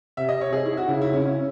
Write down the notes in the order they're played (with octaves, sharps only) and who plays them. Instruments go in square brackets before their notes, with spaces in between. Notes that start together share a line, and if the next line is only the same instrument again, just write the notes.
[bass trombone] C3 [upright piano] E5
[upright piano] D#5
C#5
G#4
E4
F#4
[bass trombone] C#3 [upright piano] E4
[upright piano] E4
C#4
C#4